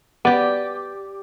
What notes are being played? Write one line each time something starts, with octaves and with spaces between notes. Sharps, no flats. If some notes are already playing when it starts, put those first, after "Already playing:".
B3 G4 D5